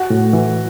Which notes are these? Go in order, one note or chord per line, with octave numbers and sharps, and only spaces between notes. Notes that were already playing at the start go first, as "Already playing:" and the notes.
Already playing: F#4
A2
E3